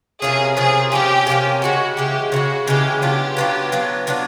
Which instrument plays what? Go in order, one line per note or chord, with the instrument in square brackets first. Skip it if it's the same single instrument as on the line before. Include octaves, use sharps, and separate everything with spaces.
[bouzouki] C3 F3 A#3 C#4 [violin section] G#4
[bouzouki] C3 F3 A#3 C#4 [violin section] G#4
[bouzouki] C3 F3 A#3 C#4 [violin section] G4
[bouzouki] C3 F3 A#3 C#4
[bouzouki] C#3 E3 G#3 [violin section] F#4
[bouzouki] C#3 E3 G#3 [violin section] G4
[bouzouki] C#3 E3 G#3 [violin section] F#4
[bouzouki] C#3 E3 G#3 [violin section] G4
[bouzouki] F#3 B3 D4 F4 [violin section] G4
[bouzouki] F#3 B3 D4 F4
F#3 B3 D4 F4
F#3 B3 D4 F4